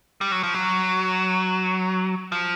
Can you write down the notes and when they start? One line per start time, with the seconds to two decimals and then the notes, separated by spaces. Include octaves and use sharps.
0.21 G3
0.32 F#3
0.43 F3
0.54 F#3
2.32 F3